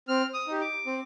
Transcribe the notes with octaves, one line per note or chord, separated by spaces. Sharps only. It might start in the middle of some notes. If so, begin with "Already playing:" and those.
C4 F6
D#6
D#4 G4
D6
C4